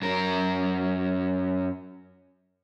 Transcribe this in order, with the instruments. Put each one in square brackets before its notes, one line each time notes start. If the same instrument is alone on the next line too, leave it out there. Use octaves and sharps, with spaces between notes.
[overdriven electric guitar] F#2 A#4